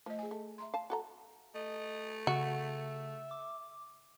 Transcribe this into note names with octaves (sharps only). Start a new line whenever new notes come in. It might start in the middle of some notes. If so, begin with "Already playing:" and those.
F3 A3 D#5
G#4 G#5
A3
E5 A#5 C6
F5 A5
F#4 A4 F#5 A#5
A3 D#5
C#3 F#4 E5
D6